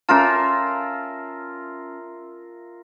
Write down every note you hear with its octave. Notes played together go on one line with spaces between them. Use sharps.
C#4 F4 A#4 E5 A5